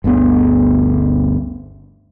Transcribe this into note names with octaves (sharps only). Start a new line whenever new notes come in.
G1 D2 D3 B3